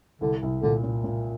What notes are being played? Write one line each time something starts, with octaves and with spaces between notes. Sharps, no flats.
C2 D3
C2
A#2 D3
A#2
A#2